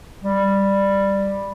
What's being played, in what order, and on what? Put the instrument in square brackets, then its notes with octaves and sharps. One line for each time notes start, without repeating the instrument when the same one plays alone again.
[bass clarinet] G3